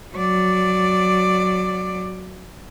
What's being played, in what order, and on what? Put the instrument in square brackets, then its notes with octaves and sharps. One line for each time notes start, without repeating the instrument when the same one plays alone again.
[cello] F#3 D5